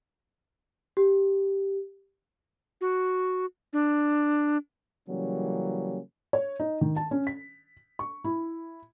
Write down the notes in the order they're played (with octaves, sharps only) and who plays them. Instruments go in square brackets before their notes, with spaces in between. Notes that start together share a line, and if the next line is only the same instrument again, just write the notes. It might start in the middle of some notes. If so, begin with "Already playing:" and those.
[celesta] G4
[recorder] F#4
D4
[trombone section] C#3 E3 F#3 G3 A#3 C#4
[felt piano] C#5
D#4
D#3
A5
C#4
B6
C#6
E4